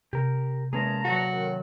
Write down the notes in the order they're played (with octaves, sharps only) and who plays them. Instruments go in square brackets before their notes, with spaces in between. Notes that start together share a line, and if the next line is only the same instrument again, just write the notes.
[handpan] C3 [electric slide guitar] G4 A#4
[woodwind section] E2 A5 A#5 [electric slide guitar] G#3 C#4 G#4 [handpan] A#3
[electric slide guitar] F#3 A4 [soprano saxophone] F#4
[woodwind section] F#2 D#3